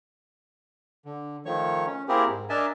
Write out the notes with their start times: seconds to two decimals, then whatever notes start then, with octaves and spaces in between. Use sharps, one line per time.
1.05 D3
1.46 D#3 F3 A3 C#5 C#6
1.86 C#4
2.08 A#3 C4 E4 G4 G#4 A#4
2.28 G#2
2.49 D4 A#4 D#5 E5 G#5 A5